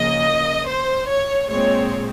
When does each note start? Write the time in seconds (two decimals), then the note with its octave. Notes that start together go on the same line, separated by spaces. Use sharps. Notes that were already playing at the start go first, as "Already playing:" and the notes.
Already playing: C#3 F3 A#3 D#5
0.67 C5
1.08 C#5
1.49 A#2 G#3 C4 C#5